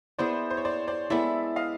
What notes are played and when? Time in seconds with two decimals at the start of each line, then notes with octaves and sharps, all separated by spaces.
0.19 B3 E4 G#4 C5 D5
0.50 C5
0.57 C#5
0.65 C5 D5
0.87 C5 D5
1.10 G#3 B3 E4 A4 D5 E5
1.56 D#5 F5